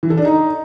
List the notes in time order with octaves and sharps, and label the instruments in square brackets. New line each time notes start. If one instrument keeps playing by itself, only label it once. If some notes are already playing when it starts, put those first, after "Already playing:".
[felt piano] E3
A4
D4
D#4